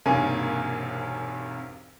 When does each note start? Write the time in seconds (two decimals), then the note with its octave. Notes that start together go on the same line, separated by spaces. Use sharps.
0.06 E1 B1 G2 C3 A#3 G#5